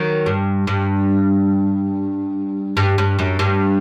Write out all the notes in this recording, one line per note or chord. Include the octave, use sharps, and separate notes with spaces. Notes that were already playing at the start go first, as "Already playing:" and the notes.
Already playing: D#3 F#3
G2
G2
G2
G2
F#2
G2